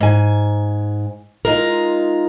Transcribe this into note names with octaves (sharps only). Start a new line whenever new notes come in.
G#2 G#5
G#3 D#4 F4 A#4